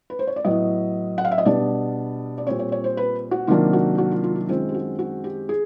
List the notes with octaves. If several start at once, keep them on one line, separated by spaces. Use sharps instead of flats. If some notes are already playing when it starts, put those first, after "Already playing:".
B4
C5
C#5
D5
A2 F#3 B3 D#5
F#5
F5
E5
D#5
B2 G3 B3 D4 D5
D5
A#2 G3 C4 C#5
C#5
C#5
C5
B4
F#4
C3 D#3 F#3 A#3 D4 F4
F#4
F#4
F4
F4
F#4
F#2 D#3 G#3 C4 F4
G4
F#4
F#4
G4
G#4